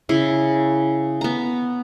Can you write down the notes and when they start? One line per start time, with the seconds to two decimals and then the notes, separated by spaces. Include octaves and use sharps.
0.09 C#3 E4
1.21 B3 A#5